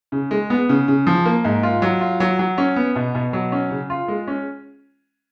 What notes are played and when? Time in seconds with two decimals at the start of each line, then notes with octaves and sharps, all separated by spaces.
0.12 C#3
0.31 G#3
0.50 B3
0.69 C#3
0.88 C#3
1.07 F3
1.26 A#3
1.45 G#2
1.63 F4
1.82 F#3
2.01 F4
2.20 F#3
2.39 F#3
2.58 C#4
2.76 B3
2.95 B2
3.15 B2
3.33 F#3
3.52 C#4
3.71 C#3
3.90 F4
4.08 G#3
4.27 C#4